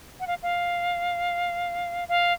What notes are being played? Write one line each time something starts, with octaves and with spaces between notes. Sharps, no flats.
F#5
F5
F5
F5